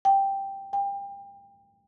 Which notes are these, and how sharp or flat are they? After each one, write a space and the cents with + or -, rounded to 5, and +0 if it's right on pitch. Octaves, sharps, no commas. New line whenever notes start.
G5 +0
G5 +30